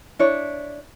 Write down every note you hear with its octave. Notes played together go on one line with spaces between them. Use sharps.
D4 E4 C#5